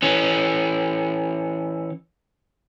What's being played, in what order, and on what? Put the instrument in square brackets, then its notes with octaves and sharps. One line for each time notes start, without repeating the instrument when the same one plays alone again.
[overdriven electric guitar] E3 C#4